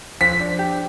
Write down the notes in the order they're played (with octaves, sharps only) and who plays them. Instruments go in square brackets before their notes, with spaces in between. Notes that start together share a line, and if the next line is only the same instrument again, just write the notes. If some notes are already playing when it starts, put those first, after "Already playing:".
[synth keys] F3 [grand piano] B6
[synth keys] D4
G4